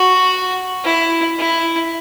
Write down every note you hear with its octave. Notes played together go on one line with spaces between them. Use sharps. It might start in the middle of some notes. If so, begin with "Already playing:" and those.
Already playing: F#4
E4
E4